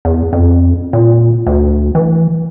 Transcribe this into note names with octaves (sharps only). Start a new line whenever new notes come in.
E2
F2
A#2
D2
E3